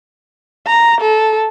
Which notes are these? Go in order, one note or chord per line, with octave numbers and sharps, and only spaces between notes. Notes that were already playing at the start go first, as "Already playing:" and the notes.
A#5
A4